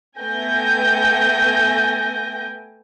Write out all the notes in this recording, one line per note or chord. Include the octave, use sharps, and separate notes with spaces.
A3 B3 G5 G#5 G6 A#6